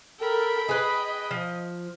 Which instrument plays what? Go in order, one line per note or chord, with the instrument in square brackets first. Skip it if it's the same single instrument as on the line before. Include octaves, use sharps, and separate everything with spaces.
[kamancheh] A4 A#4 [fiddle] G5 B5
[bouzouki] G#4 B4 [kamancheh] D#5
[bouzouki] F3